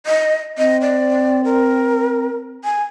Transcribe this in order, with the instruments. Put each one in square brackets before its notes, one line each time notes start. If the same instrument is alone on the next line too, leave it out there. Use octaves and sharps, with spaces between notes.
[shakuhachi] D#5
[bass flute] C4 [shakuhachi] D#5
[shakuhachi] D5
A#4
G#5